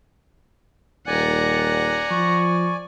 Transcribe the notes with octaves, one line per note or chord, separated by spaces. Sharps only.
D#1 D5 F#5 G#5 A#5
F3 C#6